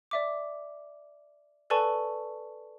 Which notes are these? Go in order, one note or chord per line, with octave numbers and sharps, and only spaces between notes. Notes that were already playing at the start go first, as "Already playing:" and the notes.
D5 E5 D6
A4 B4 D5 G#5 A5 C#6